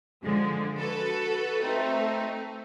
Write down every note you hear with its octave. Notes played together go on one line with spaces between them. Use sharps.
D3 F3 G#3
F#4 A4 B4
A3 C4 D#4